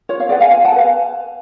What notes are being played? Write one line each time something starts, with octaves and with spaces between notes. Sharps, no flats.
F4 C#5
C#5 F5
G#4 B4 D5 F#5
F5 G#5
F4 F5 G#5
F#5 A5
G#4
B4 F5 G#5